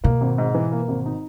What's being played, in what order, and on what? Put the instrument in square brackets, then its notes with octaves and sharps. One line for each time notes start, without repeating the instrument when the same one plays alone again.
[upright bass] B2 [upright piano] A#3
[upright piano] G#1
G#2
E3
A#3
G#1
D#4